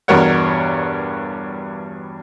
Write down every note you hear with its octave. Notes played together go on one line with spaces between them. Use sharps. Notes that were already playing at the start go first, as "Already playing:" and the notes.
E2 G2 B2 A#4 C#5 F#5